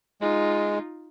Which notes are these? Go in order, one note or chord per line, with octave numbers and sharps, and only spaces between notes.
G#3 D#4 F4